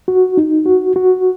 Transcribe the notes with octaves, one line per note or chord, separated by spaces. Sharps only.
F#4
D#4
F#4
F#4